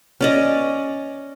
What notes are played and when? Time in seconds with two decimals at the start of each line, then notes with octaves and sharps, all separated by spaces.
0.21 C#4 D5 D#5